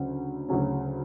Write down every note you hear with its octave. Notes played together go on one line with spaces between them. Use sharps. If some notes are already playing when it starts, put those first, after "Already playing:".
Already playing: D2 C#3 F#3 C#4
D2 C#3 F#3 C#4